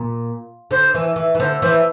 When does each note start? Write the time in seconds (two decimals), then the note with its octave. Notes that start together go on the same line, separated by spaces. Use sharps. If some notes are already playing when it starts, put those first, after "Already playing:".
Already playing: A#2
0.71 D3 C5
0.94 E3
1.16 E3
1.35 E3
1.39 D3 C5
1.62 E3 C5